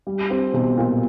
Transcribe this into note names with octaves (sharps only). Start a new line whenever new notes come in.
G3
C4
B1
A#2